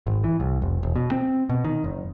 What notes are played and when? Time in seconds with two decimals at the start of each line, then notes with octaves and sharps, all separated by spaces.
0.07 G#1
0.24 E3
0.40 C2
0.62 F1
0.83 E1
0.96 B2
1.11 C4
1.49 B2
1.64 D#3
1.84 F#1